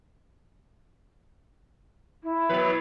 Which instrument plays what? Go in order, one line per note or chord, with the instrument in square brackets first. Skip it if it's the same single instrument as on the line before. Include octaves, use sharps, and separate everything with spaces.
[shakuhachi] E4
[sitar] B2 F#3 B4